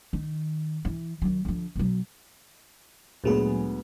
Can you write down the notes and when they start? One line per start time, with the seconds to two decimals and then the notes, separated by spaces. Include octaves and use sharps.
0.13 D#3
0.85 E3
1.22 D#3 F#3
1.45 D3 F3
1.76 B2 F#3
3.24 D2 A#2 F#3 G#3 B3 G#4